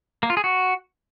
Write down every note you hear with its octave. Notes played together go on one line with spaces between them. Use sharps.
A#3
F4
G#4
F#4